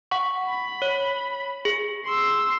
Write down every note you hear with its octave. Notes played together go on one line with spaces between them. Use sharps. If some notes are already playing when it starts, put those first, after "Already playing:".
F#5 C#6
B5
C#5
G#4
C6 E6